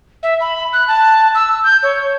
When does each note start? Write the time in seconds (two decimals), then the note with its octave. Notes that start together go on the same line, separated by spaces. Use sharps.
0.23 E5
0.40 B5
0.73 F#6
0.88 A5
1.35 E6
1.64 G6
1.83 C#5